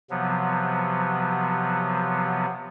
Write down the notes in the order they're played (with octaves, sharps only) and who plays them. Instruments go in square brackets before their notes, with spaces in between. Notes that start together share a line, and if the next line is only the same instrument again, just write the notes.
[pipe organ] C3 F3 F#3 B3